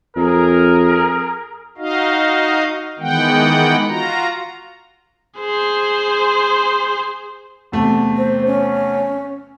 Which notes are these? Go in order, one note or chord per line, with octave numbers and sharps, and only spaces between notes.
F2 G#4 A#4
D#4 F#4 D#5 F5
D#3 E3 G#3 B3 F#5 G5
F4 F#4 A#5
G#4 C5
E2 C3 A3
C5
C#4